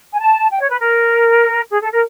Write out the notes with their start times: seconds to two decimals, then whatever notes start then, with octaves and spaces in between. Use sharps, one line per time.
0.13 G#5
0.20 A5
0.49 G5
0.60 C#5
0.70 B4
0.80 A#4
1.70 G#4
1.81 A4
1.91 A#4